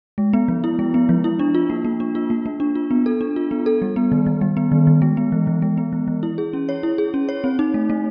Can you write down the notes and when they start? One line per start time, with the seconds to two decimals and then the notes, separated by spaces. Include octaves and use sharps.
0.18 G#3
0.33 B3
0.48 F3
0.64 E4
0.79 G#3
0.94 B3
1.09 F3
1.24 E4
1.39 D4
1.55 F4
1.70 A#3
1.85 A#3
2.00 D4
2.15 F4
2.30 A#3
2.46 A#3
2.60 D4
2.75 F4
2.91 B3
3.06 A4
3.21 D4
3.36 F4
3.51 B3
3.66 A4
3.82 G3
3.96 B3
4.12 D#3
4.26 D#3
4.41 G3
4.57 B3
4.72 D#3
4.87 D#3
5.02 G#3
5.17 B3
5.32 E3
5.47 E3
5.62 G#3
5.78 B3
5.93 E3
6.08 E3
6.23 E4
6.38 G#4
6.53 C#4
6.69 C#5
6.83 E4
6.98 G#4
7.14 C#4
7.29 C#5
7.44 C4
7.59 D#4
7.74 A3
7.90 A3